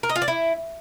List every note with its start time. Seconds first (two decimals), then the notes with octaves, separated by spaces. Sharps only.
0.03 A#4
0.09 D#5
0.16 F4
0.22 D5
0.28 E4